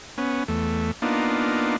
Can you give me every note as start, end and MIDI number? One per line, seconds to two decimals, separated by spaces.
0.18 0.44 59
0.18 0.44 61
0.48 0.91 40
0.48 0.91 57
1.02 1.76 58
1.02 1.76 59
1.02 1.76 62
1.02 1.76 63
1.02 1.76 65